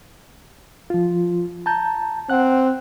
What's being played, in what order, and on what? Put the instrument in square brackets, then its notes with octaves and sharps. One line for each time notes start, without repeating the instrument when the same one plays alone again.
[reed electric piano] F3 F4
A5 A#5 G6
[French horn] C4 [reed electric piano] F#5 F#6